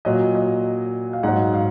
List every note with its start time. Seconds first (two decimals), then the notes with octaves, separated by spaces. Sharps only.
0.05 A#2 F#3 D#5
0.35 D#5
1.13 F5
1.23 G#2 F#3 F#5
1.54 F5